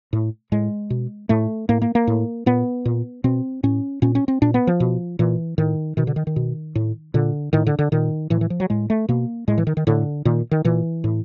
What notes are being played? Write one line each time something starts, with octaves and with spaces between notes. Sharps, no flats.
A2
A2 G#3
B2
A2 A3
A2 A#3
A#3
A#3
A2
A#2 B3
A#2
B2 C4
A2 C#4
A#2 C#4
C#4
C4
A#2 D4
B3
F3
B2
A#2 E3
A2 D#3
B2 D#3
D3
D#3
D#3
B2
A2
A#2 D3
A2 D#3
D3
D3
A#2 D#3
A2 E3
E3
F3
F#3
A2 G#3
A3
B2 A#3
A2 G#3
E3
D#3
D#3
A2 D3
A#2 D#3
D#3
A#2 E3
A2